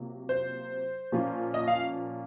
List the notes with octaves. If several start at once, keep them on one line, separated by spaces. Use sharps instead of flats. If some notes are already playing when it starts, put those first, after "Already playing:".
Already playing: C3 F#3 A#3 F4
C5
A#2 F3 A#3 C#4 F4
D#5
F5